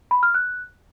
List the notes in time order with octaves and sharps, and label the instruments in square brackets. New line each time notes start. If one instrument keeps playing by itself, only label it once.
[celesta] B5
F6
F#6